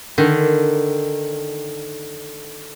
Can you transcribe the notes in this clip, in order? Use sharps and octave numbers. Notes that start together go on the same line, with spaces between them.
D3 D#3